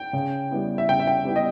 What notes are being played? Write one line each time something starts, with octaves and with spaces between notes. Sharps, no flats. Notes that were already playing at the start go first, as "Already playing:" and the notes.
Already playing: G5
C#3
G3 B3 E4
E5
C#3 G5
E5
G5
G3 B3 E4
D#5